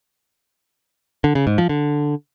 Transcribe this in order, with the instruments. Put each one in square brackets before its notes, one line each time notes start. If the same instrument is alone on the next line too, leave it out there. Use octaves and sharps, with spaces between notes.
[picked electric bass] D3
C#3
G#2
F3
D3